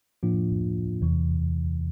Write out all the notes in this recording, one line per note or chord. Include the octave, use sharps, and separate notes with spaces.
A2 F3 A#3 D4 F4
E2 C3 E3